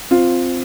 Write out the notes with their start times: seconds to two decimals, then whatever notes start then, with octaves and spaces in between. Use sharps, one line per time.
0.11 C4 F4